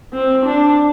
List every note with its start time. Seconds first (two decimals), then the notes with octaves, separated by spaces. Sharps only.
0.13 C4
0.46 D4